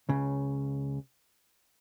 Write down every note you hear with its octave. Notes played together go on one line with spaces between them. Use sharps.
C#2 C#3